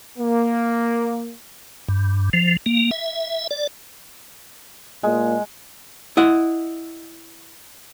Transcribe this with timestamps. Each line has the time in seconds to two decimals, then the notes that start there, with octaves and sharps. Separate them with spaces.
0.19 A#3
1.89 G2
2.33 F3
2.66 A#3
2.91 E5
3.51 D5
5.03 A#2 G#3
6.17 E4 D#5 F#5